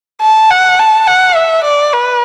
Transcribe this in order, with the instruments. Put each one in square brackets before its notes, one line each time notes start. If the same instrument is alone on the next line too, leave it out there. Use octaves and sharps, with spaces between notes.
[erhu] A5
F#5
A5
F#5
E5
D5
B4